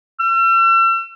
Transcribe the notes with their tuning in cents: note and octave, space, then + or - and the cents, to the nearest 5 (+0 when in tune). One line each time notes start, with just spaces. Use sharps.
E6 +40